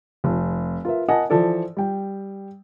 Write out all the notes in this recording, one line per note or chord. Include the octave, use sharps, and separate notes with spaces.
F1
F4 A#4 B4 E5
A#4 D#5 F#5 G#5 A5
E3 F3 A4 D5
G3 G5